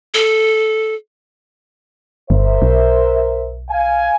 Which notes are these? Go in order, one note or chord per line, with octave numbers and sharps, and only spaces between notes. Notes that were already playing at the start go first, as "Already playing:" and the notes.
A4
G1 A#4 C5 E5
B1
F5 G#5